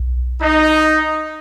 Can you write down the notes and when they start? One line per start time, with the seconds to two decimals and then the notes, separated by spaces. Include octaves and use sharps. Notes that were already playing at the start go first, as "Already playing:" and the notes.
Already playing: B1
0.42 D#4